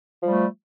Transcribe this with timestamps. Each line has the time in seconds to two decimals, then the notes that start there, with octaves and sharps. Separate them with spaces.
0.22 F3
0.24 G3
0.27 A3